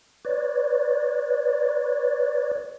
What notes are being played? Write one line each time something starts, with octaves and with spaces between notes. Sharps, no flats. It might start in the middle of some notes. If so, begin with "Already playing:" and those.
B4 C#5 D5